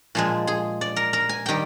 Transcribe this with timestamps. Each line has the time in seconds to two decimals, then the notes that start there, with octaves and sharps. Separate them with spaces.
0.15 A#2 F3 G#3
0.47 G#4
0.81 D5
0.96 A#4
1.13 A#4
1.29 G#5
1.46 D#3 G3 G5